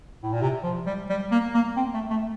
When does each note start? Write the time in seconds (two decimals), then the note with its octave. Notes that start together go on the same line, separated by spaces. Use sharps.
0.23 A2
0.33 A#2
0.41 C3
0.63 F3
0.86 G3
1.09 G3
1.31 A#3
1.54 A#3
1.76 C4
1.94 A3
2.10 A3